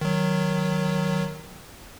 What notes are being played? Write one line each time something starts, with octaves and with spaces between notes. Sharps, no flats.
D#3 F#3